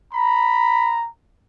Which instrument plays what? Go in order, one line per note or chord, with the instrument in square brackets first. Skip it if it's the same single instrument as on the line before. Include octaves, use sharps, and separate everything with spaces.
[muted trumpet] A#5 [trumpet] B5